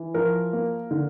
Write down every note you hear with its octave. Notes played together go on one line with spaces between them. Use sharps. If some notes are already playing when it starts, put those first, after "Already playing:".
Already playing: E3
F3 A#4
A#3
D3